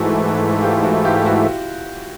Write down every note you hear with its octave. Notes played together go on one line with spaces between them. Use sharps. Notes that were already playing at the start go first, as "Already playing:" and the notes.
Already playing: G#2 E3 A3 E4 F#4
F4 G4
E4 F#4
F4 G4
G4
E4 F#4